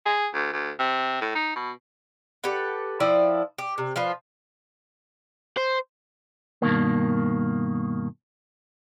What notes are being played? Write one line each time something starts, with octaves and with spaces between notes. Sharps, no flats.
G#4
D2
D2
C3
A2
D#4
B2
G4 A4 B4 F#5
F3 E4 D5 G5
G4
C3
F3 F4 B4
C5
G2 B2 D#3 A#3